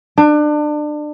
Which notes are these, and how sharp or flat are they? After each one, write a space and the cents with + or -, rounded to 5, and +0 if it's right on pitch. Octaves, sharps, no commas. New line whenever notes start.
D4 +30